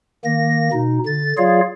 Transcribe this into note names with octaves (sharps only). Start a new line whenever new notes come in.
D#3 A#3 A#6
B2 D#4
D3 A6
F#3 F4 G#4 C#5 D5 F5